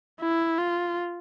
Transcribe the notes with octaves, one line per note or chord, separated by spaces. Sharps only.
E4
F4